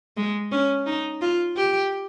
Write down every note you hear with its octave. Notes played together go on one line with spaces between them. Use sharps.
G#3
C#4
D#4
F4
G4